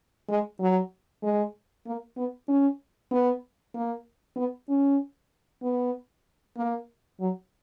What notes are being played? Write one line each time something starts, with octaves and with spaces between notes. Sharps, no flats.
G#3
F#3
G#3
A#3
B3
C#4
B3
A#3
B3
C#4
B3
A#3
F#3